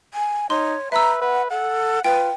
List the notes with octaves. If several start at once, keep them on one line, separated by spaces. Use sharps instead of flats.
G#5
D#4 C#5 C6
B4 E5 A#5 E6
B4 F#5
A4 F#5
F4 B4 G5